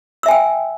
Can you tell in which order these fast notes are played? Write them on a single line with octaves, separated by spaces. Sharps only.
E6 E5 G#5 G5